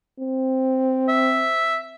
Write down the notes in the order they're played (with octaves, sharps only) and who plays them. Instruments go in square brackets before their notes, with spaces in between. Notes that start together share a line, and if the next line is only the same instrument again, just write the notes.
[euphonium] C4
[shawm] E5